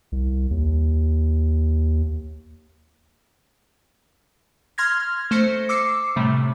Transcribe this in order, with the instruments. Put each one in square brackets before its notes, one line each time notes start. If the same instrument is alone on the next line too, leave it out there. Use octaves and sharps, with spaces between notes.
[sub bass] C2
D#2
[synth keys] C6 F6 G#6 A#6
A3 C5 A#6 C#7
D6 E6 C7 C#7
A2 C3 G3 A3